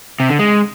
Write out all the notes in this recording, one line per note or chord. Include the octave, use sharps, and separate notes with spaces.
C3
D3
G#3